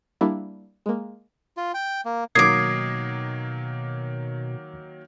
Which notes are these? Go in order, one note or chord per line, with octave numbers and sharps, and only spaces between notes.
G3 A#3 D4 E4
G#3 A#3
F4
G5
A#3
B2 D#3 F#3 A#3 D6 D#6 G#6 C7